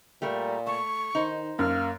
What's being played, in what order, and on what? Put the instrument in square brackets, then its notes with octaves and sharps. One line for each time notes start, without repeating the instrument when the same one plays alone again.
[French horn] A#2 [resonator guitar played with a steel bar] G3 A3 A#4
[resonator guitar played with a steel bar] A3 [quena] C#6
[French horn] D#3 [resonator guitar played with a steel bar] D#4 C5
[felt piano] F#2 [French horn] A#3 [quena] F6